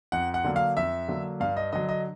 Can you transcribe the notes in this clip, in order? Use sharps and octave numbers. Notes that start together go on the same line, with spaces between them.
F2 F#5
F#5
D3 F#3 A#3
F5
F2 E5
D3 F#3 A#3
G2 F5
D#5
D3 F#3 D#5
D#5